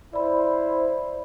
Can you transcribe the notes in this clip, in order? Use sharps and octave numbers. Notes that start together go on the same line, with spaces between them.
E4 C5 D5 B5